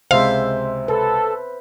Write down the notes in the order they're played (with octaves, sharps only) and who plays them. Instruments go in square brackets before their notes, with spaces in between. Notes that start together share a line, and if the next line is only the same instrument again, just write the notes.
[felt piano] C#2 C3 G#3 [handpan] C5 E5 [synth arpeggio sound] F5
[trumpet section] A4 [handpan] B4